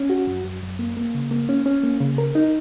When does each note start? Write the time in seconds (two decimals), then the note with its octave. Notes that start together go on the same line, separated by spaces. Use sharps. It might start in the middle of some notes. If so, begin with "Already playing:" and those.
Already playing: C#4
0.10 F#4
0.27 F#2
0.44 F#2
0.62 F#2
0.79 A#3
0.97 A#3
1.14 C#3
1.31 A#3
1.49 C#4
1.66 C#4
1.83 A#3
2.00 C#3
2.18 A#4
2.35 D#4